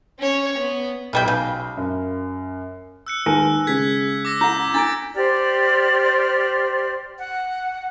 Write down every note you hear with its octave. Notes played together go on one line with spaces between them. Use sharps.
C#4 C#5
B3
B1 E3 G3 G5
C#3
F#2
E6 F#6 C#7
D#2 G#2 B4 G#5 A5 A#6
C#3 G#3 G#6 B6
D6 E6 A#6
E4 F#5 G6
D4 E4 A6 D7
G4 C5 D5 F6
F#5